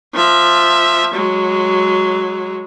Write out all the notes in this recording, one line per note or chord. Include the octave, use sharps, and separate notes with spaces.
F3 E5
F#3 G#3